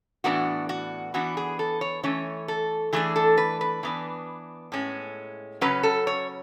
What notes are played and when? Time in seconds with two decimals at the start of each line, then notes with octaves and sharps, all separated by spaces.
0.24 A2 E3 B3 D4 F#4
0.69 F#4
1.14 E3 B3 D4 F#4
1.37 G#4
1.59 A4
1.81 C#5
2.03 E3 A3 C#4 C#5
2.48 A4
2.93 E3 A3 D4 G#4
3.16 A4
3.38 B4
3.61 B4
3.83 E3 B3 D4
4.72 A2 G#3 C#4
5.61 C#3 F#3 C#4 B4
5.83 A4
6.07 C#5